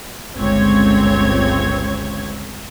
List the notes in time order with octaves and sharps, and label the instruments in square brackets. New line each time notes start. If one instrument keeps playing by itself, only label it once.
[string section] G1 C#2 C4 C#5 G#6